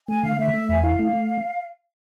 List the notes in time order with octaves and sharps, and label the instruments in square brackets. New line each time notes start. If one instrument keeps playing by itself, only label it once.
[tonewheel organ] A3 [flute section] G#5
[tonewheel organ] D3 [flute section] F5
[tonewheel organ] A3 [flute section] E5
[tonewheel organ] A3
[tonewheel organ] E2 [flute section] G#5
[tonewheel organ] E4 [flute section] F5
[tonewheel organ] A3
A3